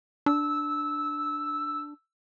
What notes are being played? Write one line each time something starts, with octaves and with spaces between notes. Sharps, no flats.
D4 E6